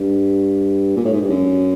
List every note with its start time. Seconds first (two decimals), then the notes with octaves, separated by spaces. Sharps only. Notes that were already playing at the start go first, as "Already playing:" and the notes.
Already playing: G2
0.96 A#2
1.05 A2
1.13 G#2
1.21 G2
1.30 F#2